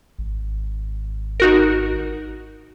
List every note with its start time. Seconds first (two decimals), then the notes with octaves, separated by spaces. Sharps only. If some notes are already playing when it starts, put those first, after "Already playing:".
0.19 G#1
1.40 D#4 F#4 A#4